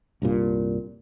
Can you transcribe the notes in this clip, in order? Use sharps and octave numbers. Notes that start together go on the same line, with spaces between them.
C2 G2 A#2